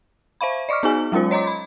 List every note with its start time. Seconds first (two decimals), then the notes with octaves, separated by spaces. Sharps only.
0.41 C5 E5 F5 B5
0.69 D5 D#5 C#6 D6 F6
0.83 B3 D#4 F#4 G#4 G#5
1.12 F#3 G#3 C#4 F4 C5
1.31 C#5 D#5 A#5 C6 D6
1.47 B5